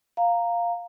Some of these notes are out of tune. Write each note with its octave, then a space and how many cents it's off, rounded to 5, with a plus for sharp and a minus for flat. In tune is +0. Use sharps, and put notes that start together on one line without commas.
F5 +0 A#5 -5